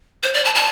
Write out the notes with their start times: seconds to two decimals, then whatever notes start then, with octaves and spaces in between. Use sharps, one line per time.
0.23 C5
0.34 D5
0.45 A5
0.55 A5